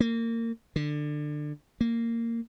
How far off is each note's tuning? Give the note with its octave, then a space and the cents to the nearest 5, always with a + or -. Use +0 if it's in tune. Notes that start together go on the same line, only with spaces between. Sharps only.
A#3 -25
D3 +20
A#3 -15